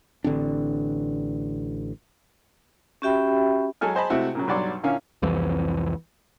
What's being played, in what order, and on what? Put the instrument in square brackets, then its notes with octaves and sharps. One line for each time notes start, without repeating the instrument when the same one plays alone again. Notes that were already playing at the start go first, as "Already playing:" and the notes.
[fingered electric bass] A1 D3 C4 D4
[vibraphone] C#4 F#4 G4 E5 G5 B5
[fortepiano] F#3 G#3 A4 G#5 F6
G#4 C5 D#5 A5 B5
C3 G#3 A3 E4 F#4
A#2 C#3 F#3
B1 G2 F#3 D5 F#5 C6
A#2 D3 A#3 C#4 E4 F5
[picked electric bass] C2 F2 E3